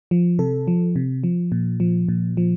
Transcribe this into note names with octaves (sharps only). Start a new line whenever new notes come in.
F3
C3 A4
F3
C3
F3
A#2
F3
A#2
F3